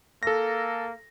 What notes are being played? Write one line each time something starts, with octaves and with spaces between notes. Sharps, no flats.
A#3 A4 A#6